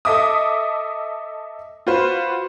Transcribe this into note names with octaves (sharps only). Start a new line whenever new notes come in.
A4 D#5 E5 D6 D#6
F4 F#4 B4 C5